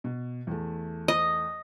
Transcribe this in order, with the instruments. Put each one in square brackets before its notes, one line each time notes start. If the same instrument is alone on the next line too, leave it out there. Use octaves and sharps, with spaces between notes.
[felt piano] B2
E2 A3
[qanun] D#5